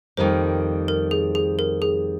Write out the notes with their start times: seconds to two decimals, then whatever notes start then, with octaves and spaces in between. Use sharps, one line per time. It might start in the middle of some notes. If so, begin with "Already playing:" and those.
0.17 F2 D#3 G3 A#3 C5
0.88 A#4
1.11 G#4
1.35 G#4
1.59 A#4
1.82 G#4